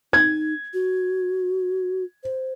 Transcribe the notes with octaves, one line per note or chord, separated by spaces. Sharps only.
D#4 G#6
F#4
C5